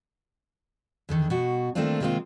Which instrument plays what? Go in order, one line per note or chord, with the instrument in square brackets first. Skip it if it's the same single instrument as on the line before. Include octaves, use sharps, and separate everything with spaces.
[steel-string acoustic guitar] E2 D3 D#3
B2 F#4
D#3 A3 A#3 C4 D4 F4
C3 D#3 G#3 A#3 C4 F4